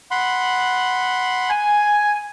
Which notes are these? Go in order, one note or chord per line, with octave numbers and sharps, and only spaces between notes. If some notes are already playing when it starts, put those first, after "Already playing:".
F#5 B5 C6
G#5